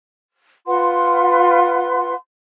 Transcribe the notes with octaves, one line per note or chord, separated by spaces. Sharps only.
F4 B4 F#5 C6